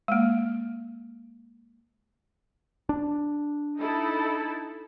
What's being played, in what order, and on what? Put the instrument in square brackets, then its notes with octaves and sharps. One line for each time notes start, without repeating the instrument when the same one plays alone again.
[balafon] G#3 A#3
[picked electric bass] D4
[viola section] D#4 E4 A4